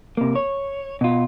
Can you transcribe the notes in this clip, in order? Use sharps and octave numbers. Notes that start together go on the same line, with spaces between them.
C3 A#3
C#5
B2 F4